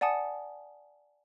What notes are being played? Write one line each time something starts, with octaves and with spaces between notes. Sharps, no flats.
D5 F#5 G#5 A5 D#6 C#7